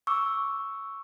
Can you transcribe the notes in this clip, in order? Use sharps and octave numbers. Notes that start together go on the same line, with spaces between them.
C#6 D6 E6